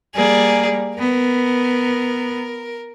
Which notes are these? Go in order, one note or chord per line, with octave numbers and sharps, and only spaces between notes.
G3 A#3 G#4 D5
B3 A#4